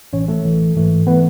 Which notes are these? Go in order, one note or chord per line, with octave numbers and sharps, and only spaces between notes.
A1 A2 E3 C#4 C#5
A3 A4
A1 A2 E3
G#2 E3 A3
E3 A3 B3 B4